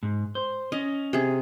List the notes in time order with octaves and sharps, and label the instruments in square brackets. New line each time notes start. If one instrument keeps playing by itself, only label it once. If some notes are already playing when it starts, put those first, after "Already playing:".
[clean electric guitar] G#2
C5
[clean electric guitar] C#4 [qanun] D#5
[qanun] C3 G#4